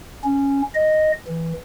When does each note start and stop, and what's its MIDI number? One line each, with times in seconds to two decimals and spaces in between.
0.24 0.62 61
0.75 1.12 75
1.28 1.53 52